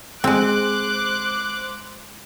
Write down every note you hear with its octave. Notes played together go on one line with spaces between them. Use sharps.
G#3 C4 C5 D6 F#6